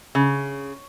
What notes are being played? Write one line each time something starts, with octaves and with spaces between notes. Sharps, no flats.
C#3